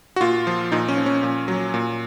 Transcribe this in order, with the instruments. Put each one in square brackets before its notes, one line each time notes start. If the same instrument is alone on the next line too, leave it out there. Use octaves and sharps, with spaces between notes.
[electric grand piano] F#4
A#2 F4
F3
A#2 D#4
C#4
F3
C#4
A#2
F#3
A#2